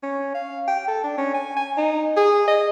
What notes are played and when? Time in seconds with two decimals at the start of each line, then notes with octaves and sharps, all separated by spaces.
0.03 C#4
0.34 F5
0.68 G5
0.88 A4
1.04 D4
1.18 C#4
1.34 G#5
1.57 G#5
1.77 D#4
2.17 G#4
2.48 D#5